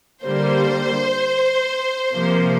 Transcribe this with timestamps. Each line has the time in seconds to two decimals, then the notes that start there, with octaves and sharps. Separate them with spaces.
0.24 D3 G3 A#3 C5
2.14 C3 F3 A#3